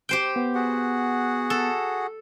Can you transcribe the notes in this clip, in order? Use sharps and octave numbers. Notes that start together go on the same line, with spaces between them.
G4 C5 G5
B3
F#4 G#4 F#5
A4